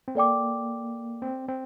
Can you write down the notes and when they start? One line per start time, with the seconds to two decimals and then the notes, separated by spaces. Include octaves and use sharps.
0.08 C4
0.15 A#3 A4 D5 G5 D6
1.22 C4
1.48 C4